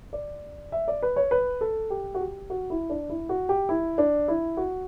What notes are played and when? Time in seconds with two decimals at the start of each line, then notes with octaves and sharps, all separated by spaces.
0.13 D5
0.72 E5
0.88 D5
1.02 B4
1.16 C#5
1.31 B4
1.61 A4
1.90 G4
2.14 F#4
2.21 G4
2.50 F#4
2.70 E4
2.90 D4
3.09 E4
3.29 F#4
3.49 G4
3.69 E4
3.98 D4
4.28 E4
4.57 F#4